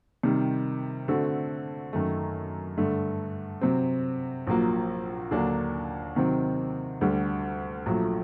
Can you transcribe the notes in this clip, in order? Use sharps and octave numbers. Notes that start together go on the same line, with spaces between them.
C3 D#3 G3
D3 A3 C4 F#4 A4
F#2 D#3 A3
G2 D3 A3
C3 F#3 C4
A#1 A#2 F#3 A#3
D#2 D3 F#3 A#3 D4
C3 D#3 F#3 C4
D2 D3 G3
A#1 A#2 F#3 A3